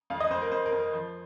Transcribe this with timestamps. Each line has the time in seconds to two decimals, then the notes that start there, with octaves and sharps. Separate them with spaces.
0.10 F2 F5
0.20 D#5
0.31 F2 C5
0.42 A#4
0.52 F2 C5
0.66 A#4
0.72 F2
0.79 A#4
0.93 F3 C5